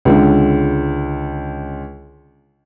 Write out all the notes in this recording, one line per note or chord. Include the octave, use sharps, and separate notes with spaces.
C#2 D3